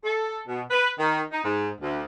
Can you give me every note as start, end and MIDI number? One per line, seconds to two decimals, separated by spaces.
0.04 0.39 69
0.47 0.63 47
0.70 0.89 71
0.99 1.21 51
1.32 1.41 63
1.44 1.69 44
1.81 2.03 38